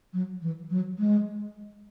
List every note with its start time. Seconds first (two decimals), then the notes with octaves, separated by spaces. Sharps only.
0.13 F#3
0.42 E3
0.70 F#3
0.99 G#3